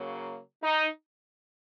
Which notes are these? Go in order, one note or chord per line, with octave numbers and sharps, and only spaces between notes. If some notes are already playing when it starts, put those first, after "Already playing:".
Already playing: C#3 F#3 A#3
D#4